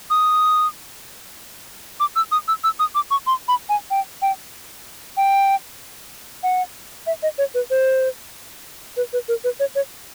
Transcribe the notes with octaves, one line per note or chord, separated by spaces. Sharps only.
D#6
D6
E6
D#6
E6
E6
D#6
D6
C#6
C6
B5
G#5
G5
G5
G5
F#5
E5
D#5
C#5
B4
C5
B4
B4
A#4
B4
C#5
C#5